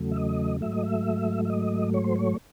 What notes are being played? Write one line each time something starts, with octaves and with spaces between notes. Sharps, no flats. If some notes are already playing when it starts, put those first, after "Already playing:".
Already playing: E2 C#3 F#3 A3
E5
D#5
G#2 F#3 A3 E5
D#5
E5
E5
D#5
C#5
C5
C#5